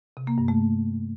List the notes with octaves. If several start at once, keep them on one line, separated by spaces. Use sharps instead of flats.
C3
A#3
G2
A3